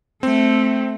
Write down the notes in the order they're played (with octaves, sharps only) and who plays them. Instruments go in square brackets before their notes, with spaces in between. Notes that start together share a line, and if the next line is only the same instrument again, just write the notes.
[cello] A3 [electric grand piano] C4